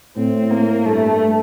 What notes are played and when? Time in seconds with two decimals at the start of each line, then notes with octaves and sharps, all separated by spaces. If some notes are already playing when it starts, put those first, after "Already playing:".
0.16 A2 C4
0.51 A#3
0.85 G2 A3